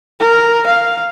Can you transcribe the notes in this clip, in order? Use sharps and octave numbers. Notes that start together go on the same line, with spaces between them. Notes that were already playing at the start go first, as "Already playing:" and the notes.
A#4
F5